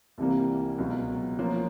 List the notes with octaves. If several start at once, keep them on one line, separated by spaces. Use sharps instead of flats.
C2 C3 E3 G3 A#3
C#2 B2 F#3
F3 A#3 C#4 F4